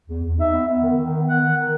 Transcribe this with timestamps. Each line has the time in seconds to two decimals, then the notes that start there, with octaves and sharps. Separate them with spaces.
0.09 E2
0.23 E2
0.37 D#4 E5
0.53 B3
0.67 B3
0.82 D#3
0.97 D#3
1.11 B3
1.26 D#3 F#5
1.41 D#3
1.56 D#3